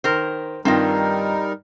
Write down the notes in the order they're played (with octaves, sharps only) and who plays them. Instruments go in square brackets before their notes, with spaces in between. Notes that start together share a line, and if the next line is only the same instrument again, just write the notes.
[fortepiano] D#3 [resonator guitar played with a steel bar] A#4 C5
[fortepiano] G2 D#3 F4 [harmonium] G3 D#4 A#4 [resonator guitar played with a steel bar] C4 D#5